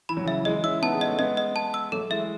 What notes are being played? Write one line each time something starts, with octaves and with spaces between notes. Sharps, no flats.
E3 B5
F#3
C#3 E3
E5
E3 G#3 D#5
C#4 E4 E6
B3 D#4 A5
G#3 B3
D#5
A3 C#4
G#3 B3 D#5
D#5
A5
E6
F#3 A3 A4
E3 G#3 E5